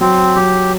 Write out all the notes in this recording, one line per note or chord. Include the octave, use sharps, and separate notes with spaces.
F#3 C4
F#3 G4